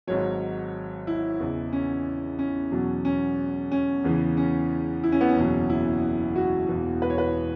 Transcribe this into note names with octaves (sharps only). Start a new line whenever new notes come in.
G#1 G#2 F#3 C#5
E4
E2 C#3 E3
C#4
C#4
E2 B2 F#3
C#4
C#4
E2 C#3 E3
C#4
E4
C#4
B3
C#4
F#1 E2 B2 F#3
E4
F#4
E1 E2 E3
B4
C#5
B4